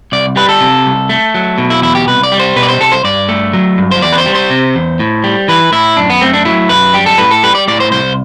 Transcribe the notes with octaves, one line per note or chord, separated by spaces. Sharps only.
C2 D5
G3 B4
A4
C3
C2
A3
F#3
B2
E4
E2 E4
G4
C2 B4
D5
G3
C5
B2 B4
D5
C5
C2 A4
C5
G2 D5
A3
F#3
G2
C5
E2 D5
B4
C5
G3
C5
C3
E2
A2
G3
E3 B4
A2 E4
F#2 D4
B3
A3 C4
D4
F#3 E4
F#2 B4
G3 G4
A4
A2 B4
A4
G3 B4
D5
A2 D5
C5
C2 C5